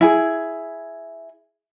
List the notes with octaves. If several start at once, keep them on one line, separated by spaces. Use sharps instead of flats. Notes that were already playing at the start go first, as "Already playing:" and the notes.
E4 G#4